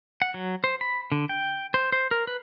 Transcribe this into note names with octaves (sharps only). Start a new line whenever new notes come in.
F#5
F#3
C5
B5
D3
G5
C5
C5
A#4
B4